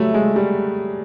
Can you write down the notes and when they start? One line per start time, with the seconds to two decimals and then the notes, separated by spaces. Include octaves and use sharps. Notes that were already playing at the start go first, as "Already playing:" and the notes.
Already playing: F#3 G3 A3 E5
0.14 G#3
0.36 G3